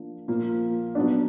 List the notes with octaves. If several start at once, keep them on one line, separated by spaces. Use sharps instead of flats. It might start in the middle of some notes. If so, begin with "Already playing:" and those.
Already playing: F3 A#3 D4
A#2 F3 A#3
F#3 B3 D4